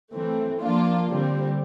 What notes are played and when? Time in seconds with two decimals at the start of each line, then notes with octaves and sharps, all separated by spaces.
0.13 E3 A3 C4
0.61 F3 A#3 D4 F4
1.08 D3 G3 C4